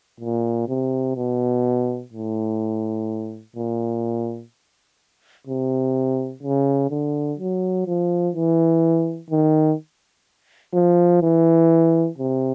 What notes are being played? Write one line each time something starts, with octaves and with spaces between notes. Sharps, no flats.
A#2
C3
B2
A2
A#2
C3
C#3
D3
F#3
F3
E3
D#3
F3
E3
C3